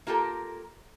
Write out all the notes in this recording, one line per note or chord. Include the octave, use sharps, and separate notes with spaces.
A#3 F4 G4 A4 A#4